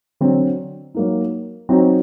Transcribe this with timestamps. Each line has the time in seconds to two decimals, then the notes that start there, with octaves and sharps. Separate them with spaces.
0.20 D3 F#3 C4
0.94 F#3 A#3 D#4
1.69 F#3 C4 D#4 F#4